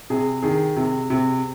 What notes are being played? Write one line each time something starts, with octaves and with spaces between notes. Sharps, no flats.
C3 G#4
D#3 G#4
C3
C3